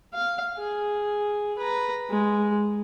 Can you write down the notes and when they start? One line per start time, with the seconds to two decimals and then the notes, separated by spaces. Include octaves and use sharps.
0.14 F5
0.59 G#4
1.58 B4 A#5
2.10 G#3